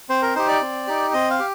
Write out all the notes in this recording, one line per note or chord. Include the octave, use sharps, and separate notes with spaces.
C4 C5
A#4
D#4 G4 C5
D5
C4
D#4 G4
C4 D#5
F5
G4